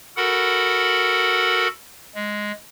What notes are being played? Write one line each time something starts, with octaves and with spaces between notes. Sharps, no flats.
F#4 A4 A#4 F#5 B5
G#3